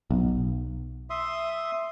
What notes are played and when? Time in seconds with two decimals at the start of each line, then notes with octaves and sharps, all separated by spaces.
0.11 B1
1.10 E5 C6 D#6